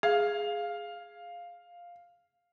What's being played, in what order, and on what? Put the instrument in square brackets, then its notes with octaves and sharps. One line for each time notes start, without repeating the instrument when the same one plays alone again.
[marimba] G#4 [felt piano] F5